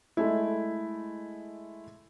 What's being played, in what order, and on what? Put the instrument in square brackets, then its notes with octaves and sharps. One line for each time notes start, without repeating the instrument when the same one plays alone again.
[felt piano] G#3 A3 E4